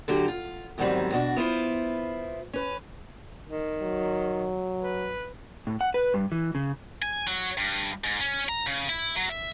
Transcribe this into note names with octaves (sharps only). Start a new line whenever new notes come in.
D3 F#3 F#4 G4
F4
E2 G#2 D#3 F#3 G3 C4
B2 D4 F#4
B3 E4 F4 C5
C#4 B4
D#3
F#3
B4
A2
F#5
B4
G2
E3
C#3
G#5
F#3
G2
G#2
C#4
A#5
C#3
E4
F#3
E5